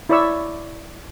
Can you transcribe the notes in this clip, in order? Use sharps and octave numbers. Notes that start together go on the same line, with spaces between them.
E4 C#5 D5 B5 C#6 E6